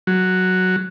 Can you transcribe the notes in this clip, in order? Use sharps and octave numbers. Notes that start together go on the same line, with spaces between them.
F#3